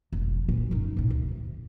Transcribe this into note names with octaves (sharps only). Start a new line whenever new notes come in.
F1 B1
A#2 E3
F#2 D#4
A2 C3
D2